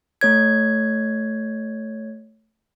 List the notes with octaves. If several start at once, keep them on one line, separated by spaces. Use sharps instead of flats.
A3 C#5 G#6